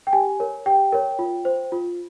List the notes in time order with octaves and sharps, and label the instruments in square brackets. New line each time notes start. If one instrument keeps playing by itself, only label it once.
[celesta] G5
G4 G#5
A#4 C#5
G4 G5
A#4 C#5
F4
C5
F4